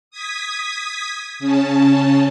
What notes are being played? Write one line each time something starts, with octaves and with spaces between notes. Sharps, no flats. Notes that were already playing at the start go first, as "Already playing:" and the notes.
D#6 G#6 B6
C#3 C#4 A5